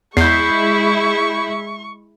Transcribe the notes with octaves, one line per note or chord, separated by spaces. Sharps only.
E2 G#3 E4 C#6 G6 C7